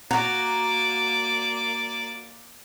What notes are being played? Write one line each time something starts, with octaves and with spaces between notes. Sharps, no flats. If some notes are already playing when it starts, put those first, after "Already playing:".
A#3 F#4 D5 A#5